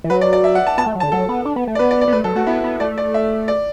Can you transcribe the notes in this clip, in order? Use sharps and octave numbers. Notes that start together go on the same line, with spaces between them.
E3
F#3 B4
D5
D5
E5
F#5
A5
B3 A5
A3
F#3
A5
D3
F#3 A4
B3
D4
B3
A3
D5
B3 B4
D5
D5
B3
A3 B4
F#3 A4
A3 F#4
B3 E4
B3
A3 D5
D5
E5
D5